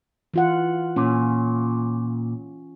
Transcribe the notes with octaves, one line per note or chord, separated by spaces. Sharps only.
E3 F4 F#5
A#2 C#4